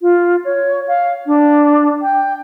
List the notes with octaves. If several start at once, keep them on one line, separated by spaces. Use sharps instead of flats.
F4
C#5
F5
D4
G5